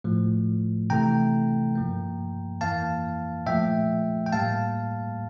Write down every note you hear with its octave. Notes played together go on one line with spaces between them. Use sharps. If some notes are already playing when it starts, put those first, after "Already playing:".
A2 F3 A3
C3 E3 A3 G5 A#5
G2 F3 A#3
F2 E3 A#3 F5 A5
A#2 F3 A3 E5 G5
G5
A2 G3 A#3 F5 A5